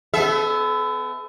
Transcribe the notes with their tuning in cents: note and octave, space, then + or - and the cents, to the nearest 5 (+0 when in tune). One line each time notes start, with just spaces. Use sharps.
B3 +35 A4 -40 E5 +0